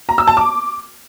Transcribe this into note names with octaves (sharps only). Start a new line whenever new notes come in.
A#5
E6
A5
D6